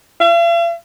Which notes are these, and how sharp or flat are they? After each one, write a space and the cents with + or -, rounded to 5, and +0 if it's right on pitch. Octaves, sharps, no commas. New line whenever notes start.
F5 -45